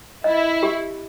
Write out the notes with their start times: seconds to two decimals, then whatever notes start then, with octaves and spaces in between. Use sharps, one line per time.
0.24 E4 D#5
0.63 G4